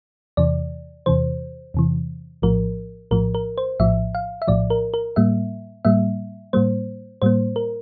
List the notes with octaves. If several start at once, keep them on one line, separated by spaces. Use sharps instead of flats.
E2 C3 E3 D5
E2 C3 E3 C5
E2 C3 E3
A#1 A2 F3 A#4
A#1 A2 F3 A#4
A#4
C5
A#1 A2 F3 E5
F5
E5
A#1 A2 F3 D5
A#4
A#4
A2 G3 A#3 E5
A2 G3 A#3 E5
A2 G3 A#3 C5
A2 G3 A#3 C5
A#4